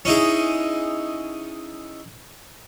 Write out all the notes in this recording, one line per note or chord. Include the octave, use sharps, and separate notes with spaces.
C#4 D#4 E4 G#4